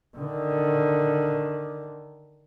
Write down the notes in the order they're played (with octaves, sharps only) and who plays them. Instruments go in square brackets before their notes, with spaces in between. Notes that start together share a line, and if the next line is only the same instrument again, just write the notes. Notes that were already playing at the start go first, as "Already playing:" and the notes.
[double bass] D3 D#3